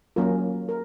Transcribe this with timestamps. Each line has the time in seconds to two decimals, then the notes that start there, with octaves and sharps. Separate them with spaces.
0.16 F#3 A#3 C#4 F4 A#4
0.69 A#4